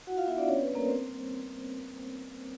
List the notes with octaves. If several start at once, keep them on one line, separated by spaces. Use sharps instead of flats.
E4 F#4 F#5
F4 F5
B3 E4 E5
D4 D5
C4 C#4 C#5
B3 B4
G3
A#3 A#4
C4 C5
G3